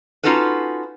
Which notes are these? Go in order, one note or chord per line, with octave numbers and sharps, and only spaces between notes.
C#4 D#4 F4 F#4 A4 B4